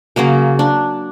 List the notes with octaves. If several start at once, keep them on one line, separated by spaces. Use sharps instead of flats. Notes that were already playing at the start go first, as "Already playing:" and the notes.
C#3 F#3 A#3 A#4
D4